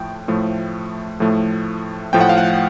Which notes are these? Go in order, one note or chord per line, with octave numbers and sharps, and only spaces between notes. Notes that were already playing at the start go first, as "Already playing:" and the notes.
Already playing: A2 F3 A3 G5
A2 F3 A3
A2 F3 A3
A2 F3 A3 G5
F#5
F5
F#5